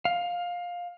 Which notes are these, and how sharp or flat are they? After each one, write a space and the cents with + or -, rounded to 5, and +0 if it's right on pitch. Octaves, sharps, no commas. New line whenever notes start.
F5 +15